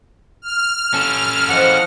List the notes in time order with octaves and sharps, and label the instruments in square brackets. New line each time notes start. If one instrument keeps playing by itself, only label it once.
[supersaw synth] F6
[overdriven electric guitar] C#4 A4
[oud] E3 F3 [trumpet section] G#3 D#5 F#5